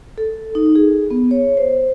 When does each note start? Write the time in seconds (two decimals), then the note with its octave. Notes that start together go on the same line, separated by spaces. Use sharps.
0.18 A4
0.55 D#4
0.75 G#4
1.11 B3
1.31 C#5
1.57 C5